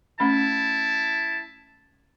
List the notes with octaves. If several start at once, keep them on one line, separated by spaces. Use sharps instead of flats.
A3 C#4 E4 A5 B5